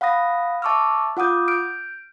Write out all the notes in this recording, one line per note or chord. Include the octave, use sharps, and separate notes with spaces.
F5 F#5 B5 D#6 A#6
E5 A5 C#6 D6 E6 F6
F4 F#5 D6 D#6 G6
F6 G6 D7